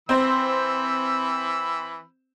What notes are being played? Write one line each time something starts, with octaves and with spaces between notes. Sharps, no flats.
E3 C4 C5 B5 E6